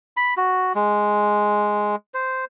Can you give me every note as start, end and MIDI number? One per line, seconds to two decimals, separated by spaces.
0.17 0.34 83
0.37 0.73 66
0.75 1.96 56
2.14 2.45 72